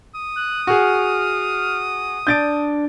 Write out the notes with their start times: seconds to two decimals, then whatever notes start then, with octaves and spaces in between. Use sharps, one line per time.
0.15 D#6
0.36 F#6
0.67 F#4 G#4 F6
2.27 D4 G6 A6 D7